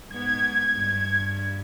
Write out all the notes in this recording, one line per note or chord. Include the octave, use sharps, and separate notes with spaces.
G#2 B3 G#6
G2